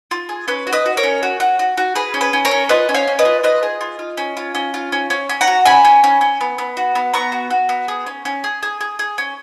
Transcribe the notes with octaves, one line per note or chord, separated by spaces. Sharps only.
F4
G#4
C#4 B4
F#4
B4 D#5
F#4
A#4 C#5
C#4
F#4
F#4
F#4
F#4
G#4 B4
C#4
B4
C#4
A#4 C#5
C#4
F4 B4 D#5
C#4
C#5 F5
C#4
B4 D#5
F4
F4 B4 D#5
G#4
F4
F4
C#4
F4
C#4
F4
C#4
C#4
C#4
F#5 A#5
F#4
C#4 G#5 B5
C#4
C#4
C#4
B3
B3
F#4
B3
B3 A#5 C#6
F#4
F#4
B3
G#4
C#4
C#4
G#4
G#4
G#4
G#4
C#4